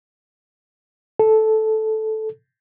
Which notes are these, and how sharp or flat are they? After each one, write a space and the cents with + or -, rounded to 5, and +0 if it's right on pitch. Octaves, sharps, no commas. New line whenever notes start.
A4 -10